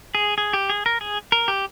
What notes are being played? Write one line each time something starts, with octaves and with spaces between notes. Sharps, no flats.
G#4
G#4
G4
G#4
A#4
G#4
A#4
G4